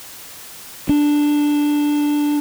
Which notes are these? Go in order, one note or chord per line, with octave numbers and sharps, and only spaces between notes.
D4